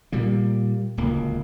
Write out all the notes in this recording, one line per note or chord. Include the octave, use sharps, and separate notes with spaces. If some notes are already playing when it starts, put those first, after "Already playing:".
A#2 G3 A#3
D1 C#2 A#3